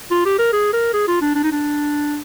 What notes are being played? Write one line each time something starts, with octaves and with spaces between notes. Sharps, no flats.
F4
G4
A#4
G#4
A#4
G#4
F4
D4
D4
D#4
D4